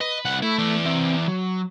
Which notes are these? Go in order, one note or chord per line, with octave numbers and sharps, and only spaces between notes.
B4 D#5
C2 F#5
A3 E4
E3 D5
C4 E5
F#3